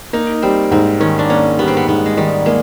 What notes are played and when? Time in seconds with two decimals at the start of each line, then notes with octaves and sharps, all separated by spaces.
0.13 A#3 D#4
0.42 G3 C4
0.71 G#2 C4
1.00 D#3 C#4
1.19 D4
1.30 A#3 C#4
1.59 G3 B3
1.68 C4
1.77 B3
1.88 G#2 B3
2.06 G#3
2.17 D#3 G3
2.46 G#3 A#3